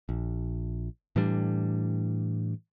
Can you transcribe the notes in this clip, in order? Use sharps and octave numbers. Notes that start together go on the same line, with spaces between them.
A#1
A2 E3 G3 D4